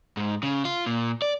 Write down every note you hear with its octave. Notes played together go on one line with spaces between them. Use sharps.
G#2
C#3
F4
A#2
D5